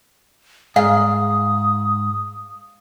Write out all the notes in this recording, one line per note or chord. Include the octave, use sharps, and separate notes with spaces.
G#2 F5 D#6